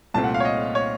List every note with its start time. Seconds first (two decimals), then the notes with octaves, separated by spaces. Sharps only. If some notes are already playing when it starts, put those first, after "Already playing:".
0.14 C2 A#2 A3 C4 A5
0.24 F#5
0.34 F5
0.40 C#5
0.45 D#5
0.75 C#5